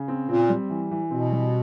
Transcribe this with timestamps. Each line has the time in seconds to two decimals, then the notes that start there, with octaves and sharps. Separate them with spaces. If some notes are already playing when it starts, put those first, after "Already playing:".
Already playing: C#3
0.08 C4
0.29 A#2 C4
0.49 G3
0.70 E3
0.91 E3
1.11 B2 C4
1.32 G3